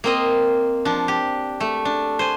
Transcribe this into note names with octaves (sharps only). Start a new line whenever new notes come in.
A#3 C4 D#5
F3 D4
G4
A3
D4
C5 G#5